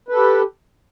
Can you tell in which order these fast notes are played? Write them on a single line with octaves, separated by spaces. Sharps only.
B4 A4 G4